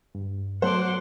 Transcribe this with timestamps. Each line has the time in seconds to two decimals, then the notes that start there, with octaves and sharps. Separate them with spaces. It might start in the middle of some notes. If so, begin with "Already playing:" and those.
0.15 G2
0.62 F#3 A3 B3 A4 C5 F#5 C6 D6